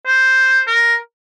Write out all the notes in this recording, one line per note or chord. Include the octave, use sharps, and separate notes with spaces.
C5
A#4